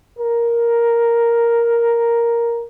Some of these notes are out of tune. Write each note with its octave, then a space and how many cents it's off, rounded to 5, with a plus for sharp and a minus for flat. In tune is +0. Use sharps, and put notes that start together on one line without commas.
A#4 +5